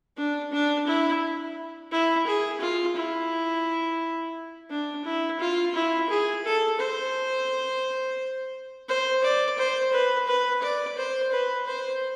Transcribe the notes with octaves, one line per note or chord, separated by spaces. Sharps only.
D4
D4
E4
E4
G#4
F4
E4
D4
E4
F4
E4
G#4
A4
C5
C5
D5
C5
B4
B4
D5
C5
B4
C5